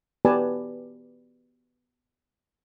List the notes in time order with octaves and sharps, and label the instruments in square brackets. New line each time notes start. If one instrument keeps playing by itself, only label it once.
[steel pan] B3 G4 B4 D5 G#5 A5